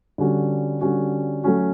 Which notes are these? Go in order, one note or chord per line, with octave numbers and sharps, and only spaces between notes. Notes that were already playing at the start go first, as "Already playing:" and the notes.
D3 G3 C#4 F#4
D3 G3 C#4 F#4
F#3 A3 C#4 F#4